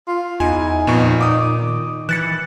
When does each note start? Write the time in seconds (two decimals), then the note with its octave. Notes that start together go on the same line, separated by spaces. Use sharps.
0.07 F4
0.40 E2 D#4 G#5
0.87 F2 A#2 B3 C#6
1.21 D6 D#6
1.57 D#3
2.09 E3 F#6 A6 C#7